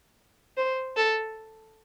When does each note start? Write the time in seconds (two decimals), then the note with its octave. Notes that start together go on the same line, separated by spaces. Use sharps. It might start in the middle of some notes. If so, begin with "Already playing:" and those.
0.57 C5
0.97 A4